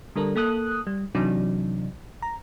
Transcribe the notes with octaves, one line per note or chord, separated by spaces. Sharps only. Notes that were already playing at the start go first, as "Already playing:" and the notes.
D3 G3 D4 A4 A#4
A#3 A4 D#6 F#6
G3
C3 E3 F#3 D4 D#4
A#5